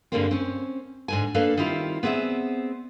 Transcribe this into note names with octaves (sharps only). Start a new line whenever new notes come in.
G2 D3 G3 G#3 A#3 C4
C4 C#4
G#2 D3 G#5
A#3 D4 A4 B4 D5 F5
D#3 G3 C4 E4 F4
B3 C4 G#4 D5 E5